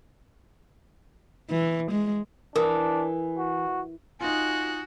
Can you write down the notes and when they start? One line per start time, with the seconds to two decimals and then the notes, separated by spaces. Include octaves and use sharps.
1.50 E3
1.92 G#3
2.56 E3 D4 A#4 D#6
3.37 F#4
4.21 D#4 F4 F#4 G#5 F#6